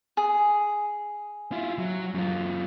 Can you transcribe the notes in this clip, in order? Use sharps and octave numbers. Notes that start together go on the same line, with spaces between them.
G#4
E4 F4
F#3
F#2 F4